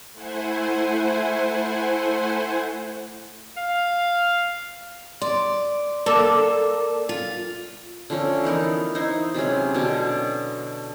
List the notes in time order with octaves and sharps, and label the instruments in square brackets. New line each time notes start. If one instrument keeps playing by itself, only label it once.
[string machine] A3 E4 C5 F#5 G#5
[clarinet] F5
[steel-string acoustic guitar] D5 [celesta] C6
[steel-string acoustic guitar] A#3 [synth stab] A4 [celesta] D5 D6 E7
[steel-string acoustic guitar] F4
[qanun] D3 F3 A3 C#4
E3 B3 D#4 A#4
D#4 E4 C5
C3 F#3 G#3 C#4
B2 D3 C#4